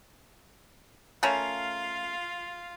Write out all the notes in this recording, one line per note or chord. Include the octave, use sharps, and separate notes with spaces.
A3 C#4 F4 A#4 F5